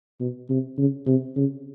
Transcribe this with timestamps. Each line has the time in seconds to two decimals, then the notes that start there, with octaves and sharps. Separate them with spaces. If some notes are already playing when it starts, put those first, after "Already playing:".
0.21 B2
0.49 C3
0.78 C#3
1.06 C3
1.36 C#3